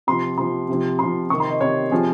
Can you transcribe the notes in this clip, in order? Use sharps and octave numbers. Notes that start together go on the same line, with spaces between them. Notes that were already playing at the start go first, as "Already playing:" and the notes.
C3 F3 C6
C3 F3 C6
C3 F3
C3 F3 C6
C3 D#3 C#6
C6
D#5
C3 D#3 C#5
C3 F3 G#4